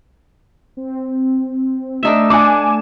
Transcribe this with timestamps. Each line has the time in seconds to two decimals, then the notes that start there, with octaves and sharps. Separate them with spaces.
0.77 C4
2.03 A3 D4 D#4 E5 E7
2.30 D4 F#5 G#5 D6